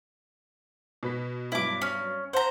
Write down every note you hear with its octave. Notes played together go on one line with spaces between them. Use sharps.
B2 B4 B6
G2 F#3 B3 E4 D6
C#4
C5 F#5 A#5